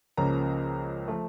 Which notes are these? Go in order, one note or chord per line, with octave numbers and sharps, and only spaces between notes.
C#2 C#3 F3 A#3 C#4 A#5
F3 A3